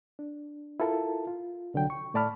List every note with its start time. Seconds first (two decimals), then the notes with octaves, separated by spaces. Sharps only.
0.19 D4
0.80 E4 F4 A4 A#4 A5
1.27 F4
1.74 C2 D3 F#3 G5
1.90 C#6
2.14 A2 A3 D5 A5 B5 F6